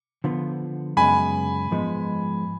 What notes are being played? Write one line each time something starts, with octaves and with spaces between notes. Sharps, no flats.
D3 F3 B3
F#2 C#3 G#3 B3 G#5 B5
G#2 F3 G#3 B3